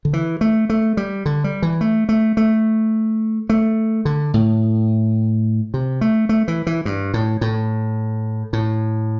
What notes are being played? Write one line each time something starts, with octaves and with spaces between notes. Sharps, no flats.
D3
E3
A3
A3
G3
D3
G3
E3
A3
A3
A3
A3
D3
A2
C3
A3
A3
E3
E3
G2
A2
A2
A2